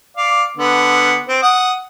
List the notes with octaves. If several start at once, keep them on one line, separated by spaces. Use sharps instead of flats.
D5 F5
D3 B3
C4
F#5 D#6